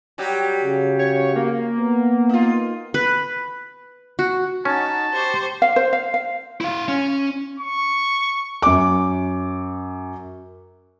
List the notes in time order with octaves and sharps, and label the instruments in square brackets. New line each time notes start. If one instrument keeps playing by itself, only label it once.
[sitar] F#3 G3 G4
[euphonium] C#3
[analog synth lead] C#5
A#3
[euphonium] B3
[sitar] D#4 F4
[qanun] B4
F#4
[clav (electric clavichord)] C#4 [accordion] D#4 F#4 [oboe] A5
[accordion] G4 C#6 [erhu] C5
[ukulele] F5
C5
F5
F5
[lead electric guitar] E4 F5
C#4
[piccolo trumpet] C#6
[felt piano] F#2 D6